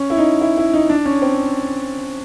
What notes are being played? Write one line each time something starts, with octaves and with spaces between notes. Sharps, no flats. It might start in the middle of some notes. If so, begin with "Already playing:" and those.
Already playing: C#4
E4
D#4
E4
E4
D#4
D4
C#4
C4